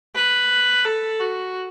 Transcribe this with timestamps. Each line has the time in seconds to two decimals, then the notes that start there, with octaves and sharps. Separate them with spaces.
0.15 B4
0.85 A4
1.20 F#4